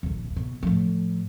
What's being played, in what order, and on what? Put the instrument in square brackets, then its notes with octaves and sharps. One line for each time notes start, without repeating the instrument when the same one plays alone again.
[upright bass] D#1 A#1
B2
A2 F3